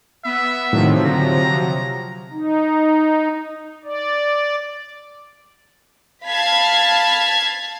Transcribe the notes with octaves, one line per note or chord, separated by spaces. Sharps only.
B3 E5
A2 C3 D#3 F3 F#3
D3 A#5
D#4
D5
F5 A5 B5 F6 G#6 B6